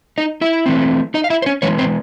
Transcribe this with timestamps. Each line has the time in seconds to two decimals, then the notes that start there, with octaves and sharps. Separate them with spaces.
0.18 D#4 D#5
0.41 E4 E5
0.66 E3 A3 C4
1.14 D#4 D#5
1.24 F5
1.30 E4 E5
1.42 C5
1.46 C#4 C#5
1.62 E3 G#3 C#4 C#5
1.78 C4 C5